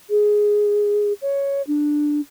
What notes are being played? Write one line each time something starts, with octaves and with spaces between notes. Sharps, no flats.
G#4
C#5
D4